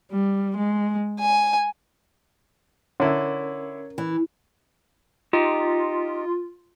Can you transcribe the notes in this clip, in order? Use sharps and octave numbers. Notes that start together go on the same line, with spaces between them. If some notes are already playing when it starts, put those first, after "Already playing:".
G3
G#3
G#5
D3 C#4 E4 A#4 C#5
E3
D#4 F4 G4